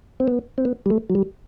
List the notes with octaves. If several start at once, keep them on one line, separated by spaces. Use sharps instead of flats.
C4
B3
C4
B3
G3
A3
F#3
G3